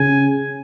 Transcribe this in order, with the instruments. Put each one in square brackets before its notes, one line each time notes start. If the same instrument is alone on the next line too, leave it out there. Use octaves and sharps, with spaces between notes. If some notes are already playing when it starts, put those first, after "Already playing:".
Already playing: [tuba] C#3 [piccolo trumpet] G#5